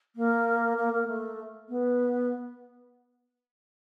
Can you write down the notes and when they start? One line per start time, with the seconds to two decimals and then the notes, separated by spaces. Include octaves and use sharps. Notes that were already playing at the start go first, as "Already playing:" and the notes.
0.16 A#3
0.77 A#3
0.93 A#3
1.07 A3
1.69 B3